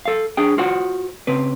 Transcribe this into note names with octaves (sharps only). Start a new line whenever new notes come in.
A4 F5
D4 G#4 G5
F4 F#4 C5 F#5
C#3 C4 B4